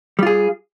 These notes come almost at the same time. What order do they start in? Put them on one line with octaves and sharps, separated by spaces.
G3 F4 G#4